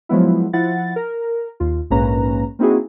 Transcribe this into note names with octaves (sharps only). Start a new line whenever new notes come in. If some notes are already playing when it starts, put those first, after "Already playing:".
F3 F#3 G#3 B3 E4
F3 E4 F#5 A6
A#4
D#2 F4
A#1 G#2 A#3 C#4 B4 A#5
A#3 C4 D#4 E4 F#4 G#4